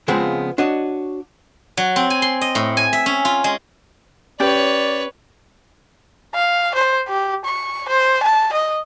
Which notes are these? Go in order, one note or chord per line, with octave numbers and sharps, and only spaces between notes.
C#3 F3 G#3 B3 C4
D4 F#4 C#5 D#5
F#3
C4
G#5
C6
D#5
A2
G#5
E5
C#4
F4
G#3
C#4 G4 B4 C#5 D5
F5
C5
G4
C#6
C5
A5
D#5